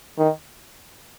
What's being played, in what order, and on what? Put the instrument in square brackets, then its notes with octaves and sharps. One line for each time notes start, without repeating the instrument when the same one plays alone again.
[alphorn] D#3